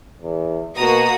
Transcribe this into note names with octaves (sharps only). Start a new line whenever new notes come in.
E2
B2 A#3 F#4 A#5 D#6